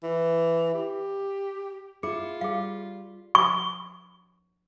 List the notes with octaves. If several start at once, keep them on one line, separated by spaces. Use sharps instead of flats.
E3
G4
E4 F4 G#4
G3 G#4 F5
C#6